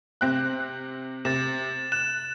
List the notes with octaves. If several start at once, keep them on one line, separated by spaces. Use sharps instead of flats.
C3 C4 F#6
C3 A6 E7
F#6 E7